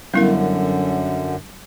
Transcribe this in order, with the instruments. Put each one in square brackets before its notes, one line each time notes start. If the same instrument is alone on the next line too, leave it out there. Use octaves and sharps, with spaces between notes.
[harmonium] F#2 D3 [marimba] F#3 G3 C#4 [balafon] B3 E4 A#4